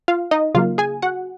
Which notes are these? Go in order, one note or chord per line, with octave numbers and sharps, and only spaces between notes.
F4 F5
D#4 D#5
C#3 F#3 A#3 F4 F5
G#4 G#5
F#4 F#5